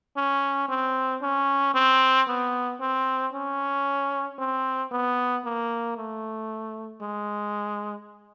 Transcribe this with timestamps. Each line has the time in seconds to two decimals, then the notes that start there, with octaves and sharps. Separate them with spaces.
0.17 C#4
0.69 C4
1.22 C#4
1.74 C4
2.27 B3
2.80 C4
3.33 C#4
4.38 C4
4.92 B3
5.44 A#3
5.97 A3
7.02 G#3